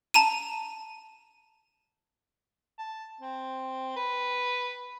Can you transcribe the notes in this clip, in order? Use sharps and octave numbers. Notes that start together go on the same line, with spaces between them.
A5 A#5 D#7
A5
C4
B4